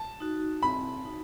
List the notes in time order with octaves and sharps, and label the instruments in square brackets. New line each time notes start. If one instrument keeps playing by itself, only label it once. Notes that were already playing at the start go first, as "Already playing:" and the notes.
Already playing: [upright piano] A5
[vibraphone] D#4 F#4
[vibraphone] C4 [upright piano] B5
[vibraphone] D#4 F#4